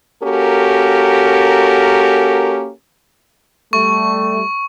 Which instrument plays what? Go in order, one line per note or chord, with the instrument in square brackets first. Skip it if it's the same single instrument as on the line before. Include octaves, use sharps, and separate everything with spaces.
[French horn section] A#3 C#4 F#4 G4 A4 A#4
[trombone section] G3 A3 [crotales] C#6